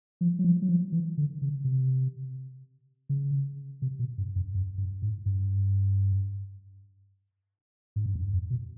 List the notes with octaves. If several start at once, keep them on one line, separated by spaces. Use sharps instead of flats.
F3
F#3
F3
F#3
F3
E3
D3
C#3
C3
C#3
C3
B2
G2
F#2
F#2
G2
G#2
G2
G#2
G2
F#2
F2
B2